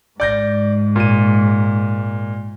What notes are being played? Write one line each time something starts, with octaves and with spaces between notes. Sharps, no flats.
G#2 D5 G6 A#6
A#2 D#7